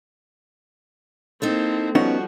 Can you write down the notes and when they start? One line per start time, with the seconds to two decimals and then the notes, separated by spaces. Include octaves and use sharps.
1.42 A#3 C4 D#4 E4 A4
1.95 F3 G3 B3 C#4 D#4 F#4